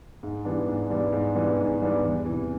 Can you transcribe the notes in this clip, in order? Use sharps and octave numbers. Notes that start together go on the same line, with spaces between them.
G#2
E3 G3 B3 D4
G#2
E3 G3 B3 D4
G#2
E3 G3 B3 D4
G#2
E3 G3 B3 D4
E2
C3 E3